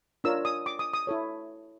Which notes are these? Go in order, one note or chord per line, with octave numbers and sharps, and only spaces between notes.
D4 F4 A#4 C#5 E6
D#6
D6
D#6
D#6
E4 A4 C#5